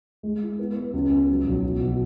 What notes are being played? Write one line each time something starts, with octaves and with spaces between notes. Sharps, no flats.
G#3
E4
B3
B3
C#2
B3
F#3
B1
B2
B2